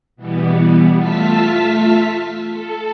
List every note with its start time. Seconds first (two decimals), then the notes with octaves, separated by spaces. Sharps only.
0.16 B2 E3 G3 B3
0.96 A3 F4 E5 A5 F6 B6
2.49 A4